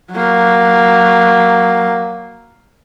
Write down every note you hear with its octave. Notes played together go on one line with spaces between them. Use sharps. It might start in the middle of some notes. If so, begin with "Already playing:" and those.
F#3 A#3